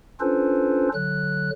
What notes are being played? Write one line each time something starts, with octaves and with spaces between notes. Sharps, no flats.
C#4 D4 F4 A4 B4 C5
D3 F#3 F#6